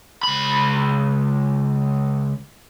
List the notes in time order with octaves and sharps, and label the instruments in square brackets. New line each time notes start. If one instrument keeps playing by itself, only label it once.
[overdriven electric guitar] C#2 B5